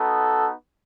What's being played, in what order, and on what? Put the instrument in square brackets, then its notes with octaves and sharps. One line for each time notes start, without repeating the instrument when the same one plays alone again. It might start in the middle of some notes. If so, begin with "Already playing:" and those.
Already playing: [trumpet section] B3 D#4 F#4 A4